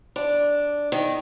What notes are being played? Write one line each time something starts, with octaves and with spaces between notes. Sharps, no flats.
D4
D#3